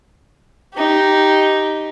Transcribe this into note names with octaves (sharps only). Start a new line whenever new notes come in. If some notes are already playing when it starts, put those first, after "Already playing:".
D#4 G4